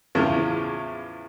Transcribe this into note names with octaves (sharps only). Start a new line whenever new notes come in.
E2 A2 C#3 F3